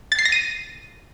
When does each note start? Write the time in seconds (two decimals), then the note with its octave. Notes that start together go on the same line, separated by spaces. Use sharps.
0.12 A6
0.19 C7
0.25 A#6
0.32 D#7